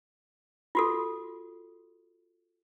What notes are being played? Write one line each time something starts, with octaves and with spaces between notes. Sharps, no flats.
F4 F#4 A4